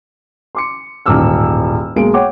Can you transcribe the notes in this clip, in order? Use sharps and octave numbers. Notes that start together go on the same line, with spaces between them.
C6 D6 C#7
D#1 A1 G#2 D6 E6 F6
B1 G#3 A#3 D7
C#5 F#5 G5 D6